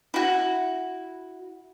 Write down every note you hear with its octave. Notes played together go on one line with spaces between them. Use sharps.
E4 F#4